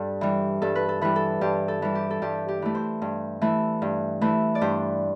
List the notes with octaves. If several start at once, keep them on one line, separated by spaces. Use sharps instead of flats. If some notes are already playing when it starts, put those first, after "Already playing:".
Already playing: G2 A4
E3 G3
G2 A4
B4
A4
E3 G3 B4
A4
G2 G4
A4
E3 G3
G4
A4
G2 G4
G4
E3 A3
C5
G2
E3 A3
G2
E3 A3
D5
G2 C5